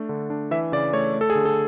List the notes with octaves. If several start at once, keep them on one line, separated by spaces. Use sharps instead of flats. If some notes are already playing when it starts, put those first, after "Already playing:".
Already playing: A3 D4
D3
D4
E3 E5
C#3 D5
A3 C#5
A3
A4
G#4
D3
A4